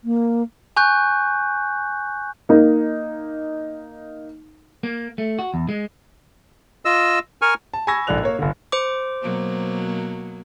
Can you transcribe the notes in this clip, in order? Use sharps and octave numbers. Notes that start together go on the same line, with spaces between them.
A#3
G#5 C#6 F#6 G6
A#3 D#4
A#3
A3
F#4
E2
G#3
F4 D#5 E6
A#4 G#5 C#6 F6
A5
G#5 B5 C#6 E6 G#6 A#6
A#1 G#2 A4 D5 F#6 F7
A#3 C#5
G1 D3
C5 D6
B2 F#3 A#3